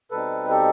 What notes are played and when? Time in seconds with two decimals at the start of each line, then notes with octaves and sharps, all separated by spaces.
0.11 B2 G3 C4 D#4 A4 B4
0.49 G4 A4